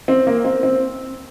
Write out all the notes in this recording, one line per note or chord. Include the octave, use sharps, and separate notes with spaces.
C4
A#3
C4
C4